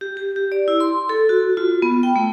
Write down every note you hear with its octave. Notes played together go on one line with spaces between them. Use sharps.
G4
G4
G4
D5
E4
C6
A4
F#4
F4
B3
G5
A3